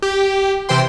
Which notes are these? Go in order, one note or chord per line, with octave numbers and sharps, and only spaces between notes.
G4
C3 E3 C5 G5 C6